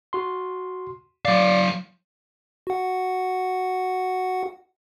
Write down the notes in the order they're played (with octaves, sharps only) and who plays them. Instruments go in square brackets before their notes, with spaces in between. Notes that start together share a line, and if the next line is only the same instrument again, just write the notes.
[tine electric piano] F#4 C6
[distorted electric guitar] F#3 F5 [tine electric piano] D5
[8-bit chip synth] F#4 F#5